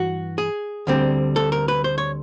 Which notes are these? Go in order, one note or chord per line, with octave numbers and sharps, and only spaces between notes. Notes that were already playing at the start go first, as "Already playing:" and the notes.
Already playing: G2 E3 F#4
G#4
D2 D3 G3 C4
A4
A#4
B4
C5
C#5